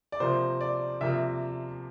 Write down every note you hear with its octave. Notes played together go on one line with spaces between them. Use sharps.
D5
C3 F3 A#3 C5
D5
C3 F3 A#3 E5